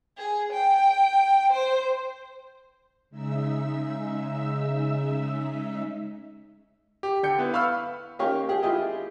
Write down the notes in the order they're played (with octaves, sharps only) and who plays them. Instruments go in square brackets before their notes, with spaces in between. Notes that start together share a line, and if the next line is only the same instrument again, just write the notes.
[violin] G#4
G5
C5
[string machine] C#3 G#3 D#4 E5 E6
[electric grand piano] G4
D3 G5 G6 C#7
B3 E4 B4
F5 B5 C#6 E6 F6
[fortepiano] A#3 C#4 D#4 G4 C#5 F5
G4 G#4
E4 F4 G4 G#4 D#5